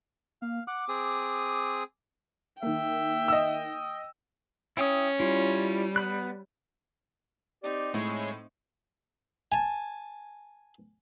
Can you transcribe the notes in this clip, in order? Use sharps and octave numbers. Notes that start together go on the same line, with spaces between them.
A#3 F5
F#5 D6
C4 G#4 D#6
D#3 A#3 E5 G5
D#5 E6
C#4 E4 G5 D#6
G3 E4 F4
B3 B5 F#6
C4 D#4 G4 D5
A2 G#3 E4 C#5
G#5 A5